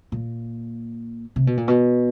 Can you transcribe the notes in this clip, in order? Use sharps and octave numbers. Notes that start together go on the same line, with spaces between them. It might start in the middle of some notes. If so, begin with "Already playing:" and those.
A#2
C3
B2
A#2
B2